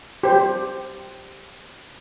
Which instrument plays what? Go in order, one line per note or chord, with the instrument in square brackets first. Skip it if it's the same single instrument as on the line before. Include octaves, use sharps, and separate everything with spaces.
[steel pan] G4 C5